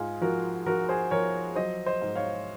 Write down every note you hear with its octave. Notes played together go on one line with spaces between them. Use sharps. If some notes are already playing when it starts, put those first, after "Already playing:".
Already playing: G#2 F4 G#4
F3 F#4 A#4
F3 F#4 A#4
G#4 C5
F3 A#4 C#5
F#3 C5 D#5
C5 D#5
G#2
C#5 F5